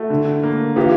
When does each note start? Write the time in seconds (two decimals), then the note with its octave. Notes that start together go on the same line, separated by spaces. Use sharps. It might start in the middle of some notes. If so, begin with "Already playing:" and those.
Already playing: A3 E4 F#4
0.10 D3
0.43 A#3
0.76 E3 F4 G4